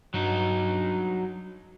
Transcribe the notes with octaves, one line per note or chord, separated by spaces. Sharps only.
G2 F#3 D#4